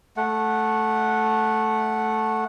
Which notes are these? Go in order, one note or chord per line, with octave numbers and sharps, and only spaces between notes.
A3 F#5